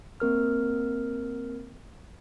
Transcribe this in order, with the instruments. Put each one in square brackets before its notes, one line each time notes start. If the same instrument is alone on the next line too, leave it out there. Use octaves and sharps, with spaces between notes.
[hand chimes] A#3 C4 A#4 F6